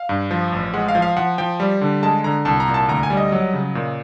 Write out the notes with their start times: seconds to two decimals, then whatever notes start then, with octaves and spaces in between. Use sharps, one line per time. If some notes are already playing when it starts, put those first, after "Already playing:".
Already playing: F5
0.09 G2
0.31 F3
0.52 A1
0.74 G#3 F#5
0.88 F5
0.95 F3
1.02 F5
1.16 F3 F#5
1.38 F3 G5
1.60 G3
1.81 D3
2.03 G#3 A5
2.24 D3 A#5
2.45 C2 A5
2.60 A#5
2.68 A#2
2.74 A5
2.88 D2 A#5
3.03 G#5
3.10 G3
3.17 D#5
3.32 F#3
3.53 C#3
3.75 A#2